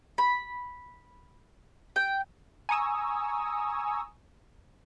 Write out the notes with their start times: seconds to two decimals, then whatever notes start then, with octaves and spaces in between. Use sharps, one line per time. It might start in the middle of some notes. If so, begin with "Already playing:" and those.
0.18 B5
1.96 G5
2.69 G#5 A#5 C#6 D#6 E6